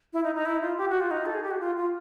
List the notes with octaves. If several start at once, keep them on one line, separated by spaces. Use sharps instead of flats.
E4
D#4
D#4
E4
F4
G4
F#4
F4
D#4
A4
G#4
G4
F#4
F4
F4